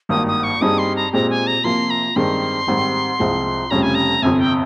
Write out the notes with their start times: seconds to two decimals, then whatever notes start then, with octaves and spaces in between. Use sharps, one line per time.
0.09 G#1 G2 D#3 A#3 D#6
0.27 D#6
0.43 C#6
0.61 G2 G3 C4 D#4 G#4 D#6
0.78 C6
0.96 A#5
1.13 A#2 G#3 C4 G4 A#5
1.30 G#5
1.47 A#5
1.64 C3 F3 A#3 C6
1.90 A#5
2.16 G2 D#3 G#3 C4 C6
2.67 G#2 D#3 G3 C4
3.19 C2 C3 F3 G#3 C4
3.70 F1 F2 C#3 G3 C#4 A#5
3.82 G#5
3.95 A#5
4.22 G1 F2 C3 G#5
4.40 G5